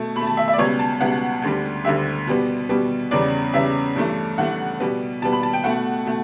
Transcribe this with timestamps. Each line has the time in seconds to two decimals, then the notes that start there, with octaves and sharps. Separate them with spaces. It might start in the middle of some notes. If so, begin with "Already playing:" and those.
Already playing: B2 A3
0.15 B2 B5
0.21 A3
0.27 A5
0.37 E5
0.48 E5
0.53 D5
0.58 C#2 B2 G3 B3 C#5
0.79 A5
1.00 C#2 B2 G3 B3 F#5
1.42 D2 D3 G3
1.85 D2 D3 G3 E5
2.27 B2 G3 B3
2.69 B2 G3 B3
3.11 E2 C#3 G3 B3 D5
3.53 E2 C#3 G3 B3 E5
3.95 G2 E3 A3
4.38 G2 E3 A3 F#5
4.80 B2 G3 B3
5.22 B2 G3 B3 A5
5.33 B5
5.43 A5
5.53 G5
5.64 B2 A3 F#5
6.06 B2 A3